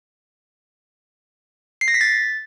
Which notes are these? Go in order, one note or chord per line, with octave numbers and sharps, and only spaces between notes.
C7
A#6
B6
A6